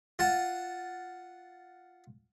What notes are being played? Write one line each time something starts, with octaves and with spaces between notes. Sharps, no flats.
F4 F#5 A5